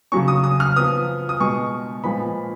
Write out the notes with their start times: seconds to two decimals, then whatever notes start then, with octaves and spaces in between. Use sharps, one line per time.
0.12 C#3 F#3 C#4 C#6
0.28 D#6
0.44 D#6
0.60 F6
0.76 F3 B3 D#6
1.29 D#6
1.40 B2 G#3 B3 C#6
2.04 A#2 F3 G#3 B3 B5